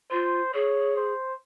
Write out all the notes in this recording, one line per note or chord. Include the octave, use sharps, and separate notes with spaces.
F4 C5
G#4 C#5
C5